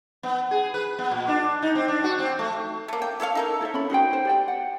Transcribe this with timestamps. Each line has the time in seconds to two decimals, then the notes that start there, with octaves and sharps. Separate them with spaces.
0.23 B3
0.51 G#4
0.74 B4
0.99 B3
1.11 A#2
1.28 D4
1.62 D#4
1.75 C4
1.88 D4
2.04 F#4
2.19 C4
2.39 A3
2.88 A3 A#3
3.02 G5
3.20 E4 A4 C#5 F5
3.35 D#4 A4 A#4
3.61 E4 A4 C5 E5
3.74 C#4 B5
3.90 D#4 F#4 C5 G5
4.13 C5
4.25 G4 D5 G5
4.48 F#5